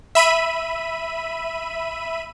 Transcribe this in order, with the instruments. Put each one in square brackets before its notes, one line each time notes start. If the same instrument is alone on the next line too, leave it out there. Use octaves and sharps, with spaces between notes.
[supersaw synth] E5 B5 D#7